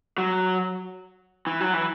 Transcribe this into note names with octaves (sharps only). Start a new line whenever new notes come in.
F#3
E3
F#3
E3